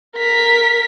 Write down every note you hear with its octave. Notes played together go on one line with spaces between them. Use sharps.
A#4 B6